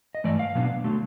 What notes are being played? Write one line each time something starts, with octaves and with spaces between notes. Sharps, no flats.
D#5
G2 E3 A3 D5
F5
B2 F#3 B3 D4
D3 F#3 A3